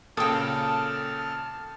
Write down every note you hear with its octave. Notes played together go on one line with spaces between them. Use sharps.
A#2 C#3 A4 G5 A5 D#6 F6